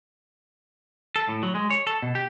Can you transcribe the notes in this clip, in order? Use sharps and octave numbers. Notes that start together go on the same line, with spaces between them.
A4
A2
F#3
G#3
C#5
A4
B2
G4